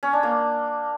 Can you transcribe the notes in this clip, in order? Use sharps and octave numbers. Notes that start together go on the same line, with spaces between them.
C#4
D4
A#3